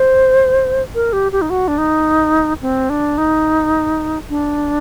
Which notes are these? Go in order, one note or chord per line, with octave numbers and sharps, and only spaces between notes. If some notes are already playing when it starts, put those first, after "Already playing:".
Already playing: C5
A#4
G4
G4
D#4
F#4
D4
D#4
C4
D4
D#4
D4